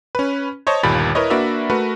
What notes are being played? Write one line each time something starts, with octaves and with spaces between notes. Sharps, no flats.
C#4 B4
C5 C#5 D#5 A5
G1 D#2 A#2 G3 B5 A6
E4 A#4 B4 C#5 D#5
A#3 D4 F#4 B4 D5 E5
A3 F#4 A#4 B4